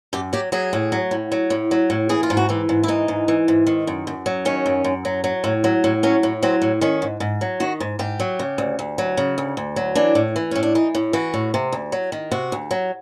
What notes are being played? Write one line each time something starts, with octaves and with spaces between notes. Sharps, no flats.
F#2 G4
F#3 G4
F#3 G#4
A2
F#3
A2
F#3
A2
F#3
A2
E3 G#4
F4
G#2
F#4
E3 G4
G#2
E4
E3 D#4
G#2
E3
G#2
D#3
F#2
F#2
F#3
D#3 C#4
F#2
F#2
F#3
F#3
A2
F#3
A2
F#3 C#4
A2
F#3 C4
A2
D#3 C#4
G#2
G#2
F#3
D#3 F#4
G#2
G#2 G4
F#3
C#3
D2
D2
F#3
C#3
D2
D2
F#3
E3 D4
A2
E3
A2 C#4
D4
E3 D#4
A2
E3 F#4
A2
C3
D2
F#3
D#3
C3 F#4
D2
F#3